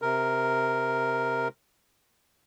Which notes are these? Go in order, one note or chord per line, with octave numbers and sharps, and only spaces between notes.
C3 A#4